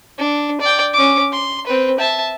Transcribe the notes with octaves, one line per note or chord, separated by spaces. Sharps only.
D4
D5 G5
C#4 D6
C6
C4 B4
E5 A5